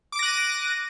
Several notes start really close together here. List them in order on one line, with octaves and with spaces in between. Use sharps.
D6 D7 A#6 F#6 D#7